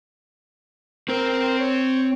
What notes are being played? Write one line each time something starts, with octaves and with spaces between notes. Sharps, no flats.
C4 A#4 C5
C#5